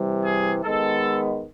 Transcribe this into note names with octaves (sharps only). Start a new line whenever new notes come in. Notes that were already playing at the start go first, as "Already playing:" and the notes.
Already playing: C3 E3 G3
G#4
D#3 G#3 B3 A4